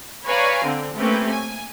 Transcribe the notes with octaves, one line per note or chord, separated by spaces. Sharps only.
B4 C#5 D5 F5 G#5 A#5
D3 C4
A3 A#3 C4 C#4 G4 B4
G#5